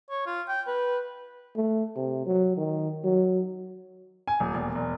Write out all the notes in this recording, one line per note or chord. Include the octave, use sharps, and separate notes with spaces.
C#5
F4
G5
B4
A3
C3
F#3
D#3
F#3
G#5
D#1
E1
E1